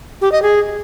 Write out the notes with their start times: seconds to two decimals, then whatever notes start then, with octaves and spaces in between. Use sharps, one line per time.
0.21 G4
0.32 D#5
0.42 G#4